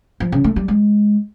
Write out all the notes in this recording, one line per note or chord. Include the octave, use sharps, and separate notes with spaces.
F3
C#3
A3
G3
G#3